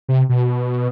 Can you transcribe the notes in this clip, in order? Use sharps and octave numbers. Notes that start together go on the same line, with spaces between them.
C3
B2